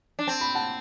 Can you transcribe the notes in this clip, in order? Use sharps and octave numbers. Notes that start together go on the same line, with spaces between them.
D4
C4 A5
B5
F#5 A5